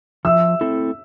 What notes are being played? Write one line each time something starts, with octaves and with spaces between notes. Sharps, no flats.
F3 E5 E6
A3 C4 E4 A4